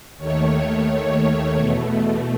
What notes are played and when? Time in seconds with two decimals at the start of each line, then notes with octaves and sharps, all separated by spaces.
0.17 D#2 D#3 A3 C#5
1.55 E2 B2 A3